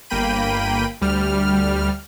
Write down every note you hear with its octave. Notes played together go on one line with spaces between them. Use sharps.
G1 A#3 G5 B5 D#7
D2 G3 F6